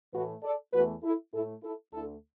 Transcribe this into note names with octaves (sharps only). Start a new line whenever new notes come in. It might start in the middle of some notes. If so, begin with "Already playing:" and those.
A2 E3 A3 F#4 B4
A4 D5
E2 E3 A3 F#4 B4
E4 A4
A2 A3 E4 A4
E4 A4
D2 D3 A3 E4 A4